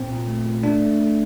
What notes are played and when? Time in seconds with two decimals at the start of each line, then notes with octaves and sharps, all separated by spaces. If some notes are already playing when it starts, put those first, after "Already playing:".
Already playing: A#2 C4
0.11 A#2
0.28 A3
0.46 A#2
0.63 A3 D4
0.82 A3
0.99 A3